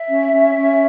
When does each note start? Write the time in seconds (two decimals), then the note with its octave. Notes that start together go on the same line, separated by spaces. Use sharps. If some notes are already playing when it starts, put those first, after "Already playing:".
Already playing: E5
0.09 C#4
0.31 C#4
0.55 C#4